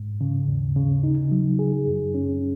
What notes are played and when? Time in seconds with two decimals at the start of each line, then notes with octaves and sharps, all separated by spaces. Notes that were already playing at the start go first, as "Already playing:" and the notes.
Already playing: G#2
0.21 C#3
0.48 D#2
0.76 C#3
1.04 D#4
1.31 F#3
1.59 G#4
1.87 F#2
2.14 C#4